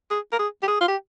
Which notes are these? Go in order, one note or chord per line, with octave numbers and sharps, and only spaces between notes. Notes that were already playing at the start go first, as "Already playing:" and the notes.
G#4
A#4
G#4
G4
G#4
F4
G4